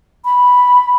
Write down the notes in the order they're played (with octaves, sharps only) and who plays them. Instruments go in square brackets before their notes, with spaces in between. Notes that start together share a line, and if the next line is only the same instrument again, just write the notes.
[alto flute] B5